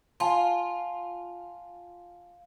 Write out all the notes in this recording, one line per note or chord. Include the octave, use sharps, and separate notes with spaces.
F4 G#5 A5 C6